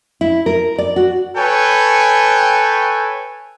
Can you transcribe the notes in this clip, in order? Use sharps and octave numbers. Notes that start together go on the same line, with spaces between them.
E4
A#4
D5
F#4
A4 B4 C#5 G5 G#5